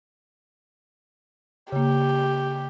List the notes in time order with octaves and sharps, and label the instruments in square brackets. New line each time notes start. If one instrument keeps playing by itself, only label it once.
[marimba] C#3 A#3 [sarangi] G4